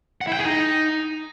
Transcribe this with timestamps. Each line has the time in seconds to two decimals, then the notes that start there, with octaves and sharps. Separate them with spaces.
0.21 F#5
0.27 E4
0.33 G5
0.39 G#4
0.45 D#4